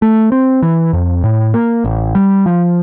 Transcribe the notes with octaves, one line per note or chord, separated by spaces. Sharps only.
A3
C4
E3
F2
A2
A#3
A1
G3
F3